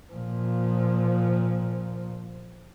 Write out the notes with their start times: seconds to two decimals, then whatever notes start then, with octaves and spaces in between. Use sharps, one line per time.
0.13 A#2 F3